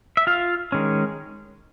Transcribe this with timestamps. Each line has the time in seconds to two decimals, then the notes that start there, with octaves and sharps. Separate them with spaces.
0.17 E5
0.27 F4 F5
0.72 D#3 G#3 C#4